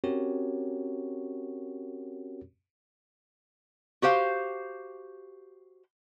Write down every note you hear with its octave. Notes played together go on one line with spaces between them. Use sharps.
C4 C#4 F#4 G4 A#4 C#5
F#4 G4 C5 F5